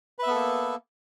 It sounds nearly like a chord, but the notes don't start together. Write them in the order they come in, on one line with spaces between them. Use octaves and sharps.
B4 E5 B3 A4 A#3